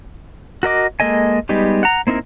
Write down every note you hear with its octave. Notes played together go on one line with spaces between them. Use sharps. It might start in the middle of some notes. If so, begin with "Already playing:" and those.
F#4 A#4 D#5 D6
G#3 A#3 A4 D#5 G#5
G3 G#3 B3 D#4 G4
F#5 A#5
A#3 C4 D#4 E4 A#4